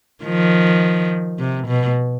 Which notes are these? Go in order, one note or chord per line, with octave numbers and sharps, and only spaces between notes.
D#3 F3
C3
B2